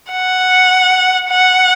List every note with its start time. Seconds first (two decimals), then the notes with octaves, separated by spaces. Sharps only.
0.12 F#5
1.30 F#5